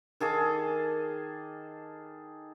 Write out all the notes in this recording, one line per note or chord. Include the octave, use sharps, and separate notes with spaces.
D#3 G#4 A4 D6